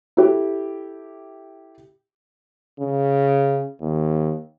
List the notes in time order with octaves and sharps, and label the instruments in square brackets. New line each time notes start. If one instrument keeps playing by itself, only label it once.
[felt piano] E4 G4 A4
[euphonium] C#3
D#2